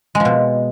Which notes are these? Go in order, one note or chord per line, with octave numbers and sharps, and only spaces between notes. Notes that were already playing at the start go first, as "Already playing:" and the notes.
G#3
F3
B2